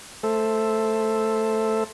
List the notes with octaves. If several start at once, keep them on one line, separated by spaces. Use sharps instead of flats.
A3 A4 C5 E5